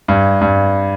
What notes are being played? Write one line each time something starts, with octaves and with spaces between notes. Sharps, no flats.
G2
G2